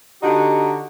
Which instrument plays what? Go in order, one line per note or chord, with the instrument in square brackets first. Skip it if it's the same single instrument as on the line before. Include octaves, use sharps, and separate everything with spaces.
[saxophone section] D3 D#4 F#4 G4